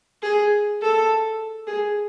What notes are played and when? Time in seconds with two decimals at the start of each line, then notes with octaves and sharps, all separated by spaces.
0.23 G#4
0.81 A4
1.67 G#4